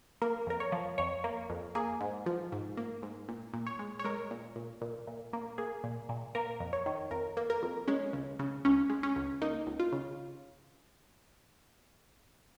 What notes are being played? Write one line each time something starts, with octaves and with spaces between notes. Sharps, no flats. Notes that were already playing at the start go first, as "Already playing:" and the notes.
A#3 A#4
F2 A#4
C#5
F3
F2 C#5
A#3
F2
A#3 G#4
G#2
F3
G#2
A#3
G#2
A#2
A#2
C#5
G#3
C#5
G#3 A#4
A#2
A#2
A#2
A#2
A#3
A#3 G#4
A#2
A#2
A#3 A#4
F2
C#5
D#3
F2 A#4
A#3
A#4
F2
G#3 C#4
C#2
C#3
C#2 C#4
G#3
C#4
C#2
A#3 D#4
C#2
F4
C#3